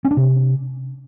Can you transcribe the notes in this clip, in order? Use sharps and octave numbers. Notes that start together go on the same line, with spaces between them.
C#4
D4
C3